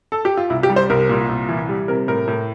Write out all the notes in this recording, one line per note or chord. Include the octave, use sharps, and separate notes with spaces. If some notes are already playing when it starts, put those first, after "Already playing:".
A4
G4
F4
C2 E4
G4
G3
C5
C2 A#4
A#2
C2
E3
G3
C3 A#4
A2 A#4
A2